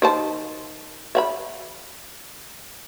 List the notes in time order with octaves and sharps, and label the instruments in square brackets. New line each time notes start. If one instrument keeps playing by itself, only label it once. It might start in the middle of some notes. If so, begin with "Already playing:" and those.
[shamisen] D#3 C5 A5
E5 F#5 B5